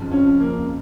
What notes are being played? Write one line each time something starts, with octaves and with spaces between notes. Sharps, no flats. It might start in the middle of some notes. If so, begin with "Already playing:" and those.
Already playing: F2 C#3 F3
C#4
A#3